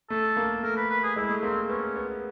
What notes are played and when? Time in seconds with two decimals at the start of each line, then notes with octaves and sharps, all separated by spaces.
0.10 A3 A4
0.37 A#3
0.63 A3 A#4
0.77 B4
0.90 B4
1.03 G#4
1.16 G#3 E4
1.29 A3
1.43 A#3 C4
1.69 B3 C#4
1.95 B3